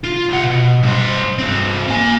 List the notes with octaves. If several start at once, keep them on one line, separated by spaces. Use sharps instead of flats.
F4
C2 F#5
B2
G2 C5
G2 C4
A#3 G#5